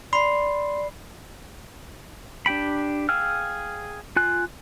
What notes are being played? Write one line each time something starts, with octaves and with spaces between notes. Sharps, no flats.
D5 B5 C6 C7
D4 G4 G5 B5
G#4 F5 G5 E6 F6
F4 G#5 F#6